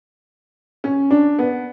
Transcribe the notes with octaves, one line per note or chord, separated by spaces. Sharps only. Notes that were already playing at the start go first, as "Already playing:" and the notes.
C#4
D4
B3